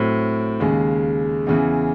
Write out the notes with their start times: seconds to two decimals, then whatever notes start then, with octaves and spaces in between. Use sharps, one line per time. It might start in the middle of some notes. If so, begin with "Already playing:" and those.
Already playing: A2 F#3 C4
0.60 D#2 C#3 G#3
1.47 E2 C#3 E3